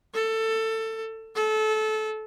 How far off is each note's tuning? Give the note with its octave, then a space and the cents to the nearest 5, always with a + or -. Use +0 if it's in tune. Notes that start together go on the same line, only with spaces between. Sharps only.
A4 +20
A4 -25